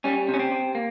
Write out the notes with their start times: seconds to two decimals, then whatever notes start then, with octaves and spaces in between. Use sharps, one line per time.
0.04 G3 C#4
0.28 C3
0.34 C#4
0.39 C4
0.52 C3
0.75 A#3